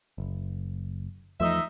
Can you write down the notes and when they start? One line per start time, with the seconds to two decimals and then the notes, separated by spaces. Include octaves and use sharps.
0.18 F#1
1.40 E2 F3 A3 D#4 D#5 E5